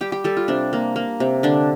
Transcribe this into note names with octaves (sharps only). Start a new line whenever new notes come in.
G3 G4
G4
G3 A4
F4
C3 D4
A#3
A#3
C3
D3 D4